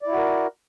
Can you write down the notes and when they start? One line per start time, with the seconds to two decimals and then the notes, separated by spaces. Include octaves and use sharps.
0.02 D5
0.07 E4
0.12 F#4
0.17 A#4